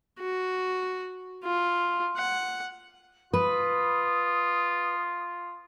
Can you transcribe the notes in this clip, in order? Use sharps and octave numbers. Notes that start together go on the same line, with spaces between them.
F#4
F4
F#5
F4 B4 D#6